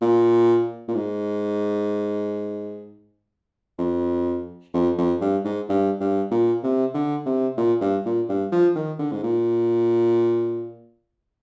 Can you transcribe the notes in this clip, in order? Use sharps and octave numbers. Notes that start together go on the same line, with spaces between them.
A#2
A#2
G#2
F2
F2
F2
G2
G#2
G2
G2
A#2
C3
D3
C3
A#2
G2
A#2
G2
F3
D#3
D3
G#2
A#2